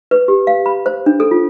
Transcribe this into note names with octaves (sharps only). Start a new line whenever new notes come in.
B4
G4
F5
B5
C5
D4
A4
F4